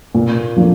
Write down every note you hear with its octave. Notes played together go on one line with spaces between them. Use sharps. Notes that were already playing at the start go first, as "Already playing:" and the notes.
A#2
F3 A#3 D4